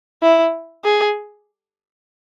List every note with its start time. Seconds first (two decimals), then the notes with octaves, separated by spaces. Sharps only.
0.22 E4
0.85 G#4